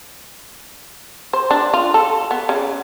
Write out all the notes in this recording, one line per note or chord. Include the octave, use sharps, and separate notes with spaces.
C5
D4
F4
A4
B3
C#3